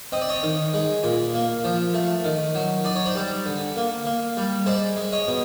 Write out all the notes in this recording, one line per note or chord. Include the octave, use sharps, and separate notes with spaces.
C4 D#5
D5
C#5 D#5
D#3
G#3
A#2
A#3
F3
A3
D#3
F#3
D#4 D5
C#5
C5 D5
G3
D3
A#3
A#3
G3
G#3 C5 D5
G#3
C#5 D#5
B2